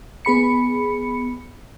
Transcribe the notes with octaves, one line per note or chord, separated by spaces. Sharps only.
B3 G#4 B5 C#7